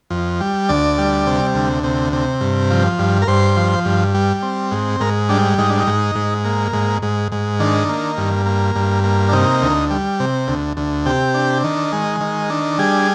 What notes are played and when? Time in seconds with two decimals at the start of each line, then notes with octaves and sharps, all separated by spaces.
0.10 F2
0.40 G3
0.69 D2 D5
0.98 G3
1.27 C3
1.54 D2
1.84 C3
2.13 C3
2.41 G2
2.71 F3
2.99 G2
3.22 A#4
3.28 G2 C5
3.57 F3
3.85 G2
4.15 G3
4.43 C4
4.72 G#2
5.00 G#2 A#4
5.29 G3 D4
5.58 G#2 D#4
5.70 D4
5.80 D#4
5.87 G#2
6.15 G#2
6.45 A#3
6.73 G#2
7.02 G#2
7.32 G#2
7.60 D#3 D4
7.89 A#3
8.18 G2
8.46 A#3
8.76 G2
9.04 A#3
9.29 D4
9.33 C3 D#4
9.62 D2
9.90 G3
10.20 C3
10.48 D2
10.77 D2
11.06 C3 G4
11.34 D4
11.64 D#3
11.93 G#3
12.21 D#3
12.50 D4
12.79 G3 G#4